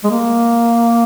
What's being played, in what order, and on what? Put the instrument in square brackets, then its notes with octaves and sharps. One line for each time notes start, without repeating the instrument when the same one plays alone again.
[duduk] G#3
A#3